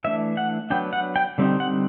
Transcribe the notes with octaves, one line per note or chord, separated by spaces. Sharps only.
E3 A3 D4 E5
F#5
F#3 B3 D4 G5
F#5
G5
D3 G3 C4 D#4
F#5